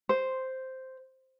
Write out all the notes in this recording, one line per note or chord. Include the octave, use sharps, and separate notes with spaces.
C5